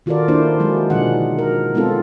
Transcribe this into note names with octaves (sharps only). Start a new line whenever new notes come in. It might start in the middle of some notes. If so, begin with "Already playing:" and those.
D#3 F4 F#4 A4 A#4 D5
A#3 D4 E4 C5
F#3 G#3 G#4
B2 D3 F3 F#3 D#4 F#5
A#4
G#3 B3 C4 D#4 F4 A4